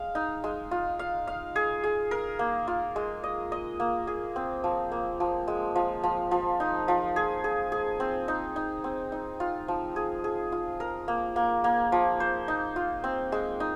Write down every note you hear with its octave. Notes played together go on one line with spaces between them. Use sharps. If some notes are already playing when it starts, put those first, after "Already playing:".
Already playing: G#3 F5
D#4
G#3
F4
F5
F5
G#4
G#4
A#4
A#3
F4
G#3
D#5
D#5
A#3
G#4
C4
F3
A#3
F3
G#3
F3
F3
F3
D#4
F3
G#4
G#4
G#4
C4
D#4
D#4
C4
D#4
F4
F3
G#4
G#4
F4
A#4
A#3
A#3
A#3
F3
C5
D#4
F4
C4
G#3
D#4